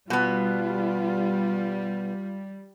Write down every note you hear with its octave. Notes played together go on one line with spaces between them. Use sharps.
B2 G3 B3 F4